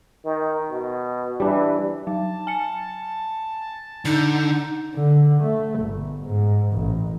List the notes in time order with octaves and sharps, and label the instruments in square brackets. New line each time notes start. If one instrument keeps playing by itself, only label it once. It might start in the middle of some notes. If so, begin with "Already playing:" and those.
[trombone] D#3
B2
[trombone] E3 [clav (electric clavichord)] G3 D4
[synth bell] F#3 [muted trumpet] A5
[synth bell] G#5 C#7
[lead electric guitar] D3 [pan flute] D#4
[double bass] D3
A3
G1
G#2
A1